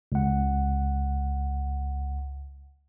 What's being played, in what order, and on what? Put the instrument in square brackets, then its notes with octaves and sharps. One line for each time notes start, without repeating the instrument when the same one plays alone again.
[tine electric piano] C#2 F#5